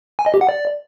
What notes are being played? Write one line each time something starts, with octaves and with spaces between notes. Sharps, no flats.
G#5
D#5
G4
F#5
D5